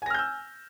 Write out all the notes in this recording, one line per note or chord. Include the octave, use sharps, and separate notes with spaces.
G#5 E6 F6 G6 A#6